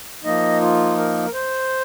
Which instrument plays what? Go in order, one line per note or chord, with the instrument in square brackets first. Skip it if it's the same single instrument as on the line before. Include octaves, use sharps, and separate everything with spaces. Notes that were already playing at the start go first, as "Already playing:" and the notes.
[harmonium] F3 A#3 D#4 D#5
F4
A#4
C5